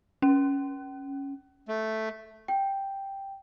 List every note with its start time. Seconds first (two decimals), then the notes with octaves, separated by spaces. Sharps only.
0.22 C#4
1.68 A3
2.48 G5